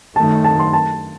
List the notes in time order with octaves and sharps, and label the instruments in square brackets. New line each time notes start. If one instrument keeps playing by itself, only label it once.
[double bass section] F#2 D#3 A3 [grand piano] A5
[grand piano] A5
C6
A5